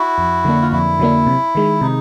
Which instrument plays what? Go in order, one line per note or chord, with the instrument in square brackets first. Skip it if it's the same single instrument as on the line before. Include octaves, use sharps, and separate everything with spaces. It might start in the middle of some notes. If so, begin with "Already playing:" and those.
Already playing: [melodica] E4 F#4
[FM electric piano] F2
D3 F#3 A#3 D4
[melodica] F4
[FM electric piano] F2 [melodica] E4
[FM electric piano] D3 F#3 A#3 D4
C3
D#3 G#3
[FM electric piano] C3 [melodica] D#4